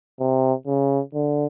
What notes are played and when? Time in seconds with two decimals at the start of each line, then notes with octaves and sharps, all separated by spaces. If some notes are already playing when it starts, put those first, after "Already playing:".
0.20 C3
0.67 C#3
1.14 D3